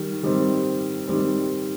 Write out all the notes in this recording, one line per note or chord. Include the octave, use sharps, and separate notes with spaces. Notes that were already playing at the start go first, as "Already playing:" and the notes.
Already playing: D#3 G3
D#3 G3 C4
D#3 G3 C4